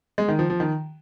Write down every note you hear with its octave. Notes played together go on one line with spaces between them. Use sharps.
G#3
D#3
F3
F3
D#3